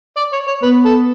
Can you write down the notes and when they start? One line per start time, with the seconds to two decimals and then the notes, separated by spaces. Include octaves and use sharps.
0.16 D5
0.33 C#5
0.47 C#5
0.62 B3 B4
0.85 A4